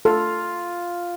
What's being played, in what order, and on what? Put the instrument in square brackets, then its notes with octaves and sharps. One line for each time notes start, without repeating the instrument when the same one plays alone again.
[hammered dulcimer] F4 [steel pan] A4